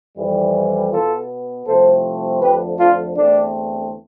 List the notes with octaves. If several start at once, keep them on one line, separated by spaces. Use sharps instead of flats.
F2 E3 G3
B2 B3 F4 A4
C2 C3 F3 A3 C4 A4 C5
F2 D3 F3 A3 G4 B4
D4 F4
E2 D3 A3 C4 D4